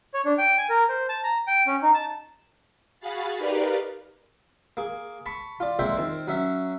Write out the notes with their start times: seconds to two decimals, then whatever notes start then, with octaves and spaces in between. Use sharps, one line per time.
0.14 C#5
0.25 D4
0.38 G5
0.58 G#5
0.70 A#4
0.89 C5
1.09 A5
1.24 A#5
1.47 G5
1.67 C#4
1.83 D#4
1.94 A5
3.00 F#4 G#4 F5 B5 A6
3.38 D#4 G4 A#4 B4 D5 F5
4.77 A#3 G#4
5.26 A5 B5 C#6
5.60 F4 D5
5.79 F2 A#2 G#3 C5 E5 G5
5.97 D#3 C4
6.27 F#3 C#4 E5